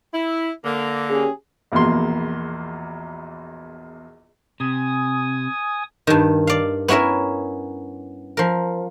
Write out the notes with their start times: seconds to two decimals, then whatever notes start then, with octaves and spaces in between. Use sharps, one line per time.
0.13 E4
0.65 D3 A#3
1.09 C#4 G4 G#4
1.72 A#1 E2 B2 A#3 C6
4.60 C3 G#5 D#6
6.07 G2 D#3
6.47 D5 F5
6.88 B3 C#4 E4 A#4 E5
8.37 F3 A#4